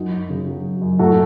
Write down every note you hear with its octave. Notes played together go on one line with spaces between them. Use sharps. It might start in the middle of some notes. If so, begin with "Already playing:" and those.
Already playing: F#2 D#4 F#4
F#2
C#3
F#3
F#2
F#2
A2 F#4 A4